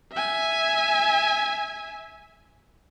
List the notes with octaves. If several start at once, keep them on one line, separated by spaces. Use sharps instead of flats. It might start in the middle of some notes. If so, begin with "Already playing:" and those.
E5 G#5